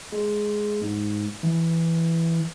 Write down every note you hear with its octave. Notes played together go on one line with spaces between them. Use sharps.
G#3
G#2
E3